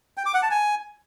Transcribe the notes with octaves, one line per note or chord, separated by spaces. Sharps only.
G5
D6
F#5
A5
G#5